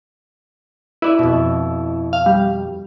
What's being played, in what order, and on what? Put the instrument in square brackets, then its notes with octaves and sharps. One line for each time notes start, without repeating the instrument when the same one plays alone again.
[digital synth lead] E4 [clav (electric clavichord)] B4 D5 E5
[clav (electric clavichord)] F2 B2
[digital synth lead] F5
G3